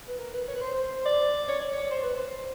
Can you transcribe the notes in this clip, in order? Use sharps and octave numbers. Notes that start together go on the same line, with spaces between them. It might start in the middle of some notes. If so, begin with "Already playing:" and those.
B4
A#4
B4
C#5
B4
C5
D5
C#5
D5
C#5
C5
B4
C5